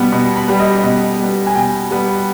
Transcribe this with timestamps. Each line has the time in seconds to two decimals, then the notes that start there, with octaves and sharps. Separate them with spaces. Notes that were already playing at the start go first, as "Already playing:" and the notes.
Already playing: B2 G3 B3
0.12 B2
0.36 B5
0.48 G3 B3
0.60 D#5
0.84 B2 D#5
1.19 G3 B3
1.47 G#5
1.55 B2 G5
1.91 G3 B3